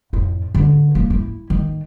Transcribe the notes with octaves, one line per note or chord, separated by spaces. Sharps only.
F2 A2
D3 C#4
A2 A#3
E4
D#3